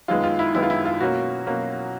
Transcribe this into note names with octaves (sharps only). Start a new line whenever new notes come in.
F#2 D#3 G#3 B3 F4
F4
E4
F#2 D#3 G#3 B3 E4
F4
E4
F4
B2 F#3 A#3 C#4 F#4
B2 F#3 A#3 C#4